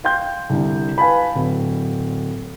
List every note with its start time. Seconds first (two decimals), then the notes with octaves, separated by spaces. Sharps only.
0.04 F5 G5 C6 G6
0.50 C2 D3
0.98 B4 F5 G#5 A5 B5
1.35 D1